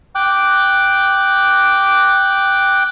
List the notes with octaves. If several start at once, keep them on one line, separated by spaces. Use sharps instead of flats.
G5 D6 F#6